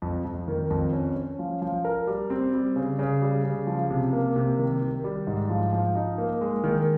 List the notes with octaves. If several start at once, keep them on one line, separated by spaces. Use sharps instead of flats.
F2
F2
D#3
F2
C#4
C#4
F3
F3
A#4
G3
C4
G3
C#3
C#3
G3
C#3
F3
C3
A#3
C3
D#3
D#3
G3
G#2
F3
F3
D#4
A#3
G#3
D#3